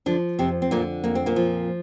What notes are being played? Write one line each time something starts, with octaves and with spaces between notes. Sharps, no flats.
D3 F3 D4
F2 C3 C4
C4
A#2 D3 A#3
F2 A#3
C4
A#2 A#3
F3